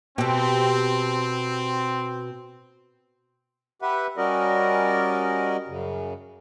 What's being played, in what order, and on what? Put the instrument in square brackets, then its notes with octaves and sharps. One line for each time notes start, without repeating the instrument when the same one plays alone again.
[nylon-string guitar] B2 [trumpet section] C4 [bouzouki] G4 A4
[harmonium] G4 B4 E5 F#5
G3 C#4 F#4 A#4 D5 D#5
F#2 C#3